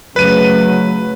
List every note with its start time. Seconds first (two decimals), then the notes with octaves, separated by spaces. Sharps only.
0.16 C#3 F#3 A3 C#4 B4 D#7